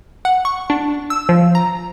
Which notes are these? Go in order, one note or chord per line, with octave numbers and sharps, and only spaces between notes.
F#5
C#6
D4
E6
F3
A#5